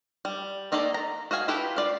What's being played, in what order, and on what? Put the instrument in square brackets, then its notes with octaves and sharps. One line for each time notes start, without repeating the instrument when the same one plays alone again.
[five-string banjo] G3
A#3 D#4 A4 D5 D#5
A#5
F#4 D#5 F5 G#5
E4 F4 G4 A4 B4
F4 D5 F5